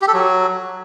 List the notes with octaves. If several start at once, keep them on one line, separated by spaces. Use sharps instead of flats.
G4
A4
F#3